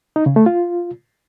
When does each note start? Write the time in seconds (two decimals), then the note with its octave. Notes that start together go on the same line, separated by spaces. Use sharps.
0.16 D#4
0.26 C#3
0.36 A3
0.46 F4